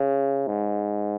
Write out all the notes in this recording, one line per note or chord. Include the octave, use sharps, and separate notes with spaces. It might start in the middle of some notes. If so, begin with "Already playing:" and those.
Already playing: C#3
G#2